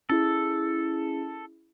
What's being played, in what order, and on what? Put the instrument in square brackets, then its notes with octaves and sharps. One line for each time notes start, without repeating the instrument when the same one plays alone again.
[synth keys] C#4 E4 G#4 [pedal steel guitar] A4